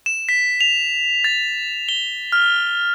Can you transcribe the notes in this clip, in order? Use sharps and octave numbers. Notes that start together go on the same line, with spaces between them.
E7
B6
F7
A6
G7
F6